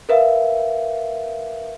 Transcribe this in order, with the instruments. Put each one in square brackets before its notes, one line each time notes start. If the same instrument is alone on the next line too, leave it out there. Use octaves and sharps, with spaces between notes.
[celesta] A#4 B4 E5 F5